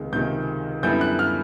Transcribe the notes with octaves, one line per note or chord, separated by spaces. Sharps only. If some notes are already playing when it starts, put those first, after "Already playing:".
Already playing: C#2 C3 D#3 G#3
C#2 C3 D#3 G#3 G6
F#2 D3 G3 B3 E4 G6
F#6
F6